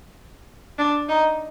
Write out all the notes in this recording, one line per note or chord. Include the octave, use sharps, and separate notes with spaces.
D4
D#4